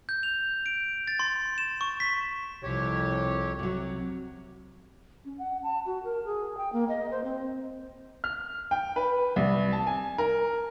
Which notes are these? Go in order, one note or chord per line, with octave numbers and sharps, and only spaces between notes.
G6
F7
D7
A6
C6
E7
C#6
B6
C2 F2 G4 C#5
C3 F#3
C#4
F#5
A5
F#4
A#4
G#4
G5
A#3
D#5
C5
C4
F6
G5
B4
C2
A5
G#5
A#4